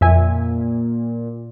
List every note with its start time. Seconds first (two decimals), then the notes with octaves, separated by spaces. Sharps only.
0.01 F2 A#2 E5 G#5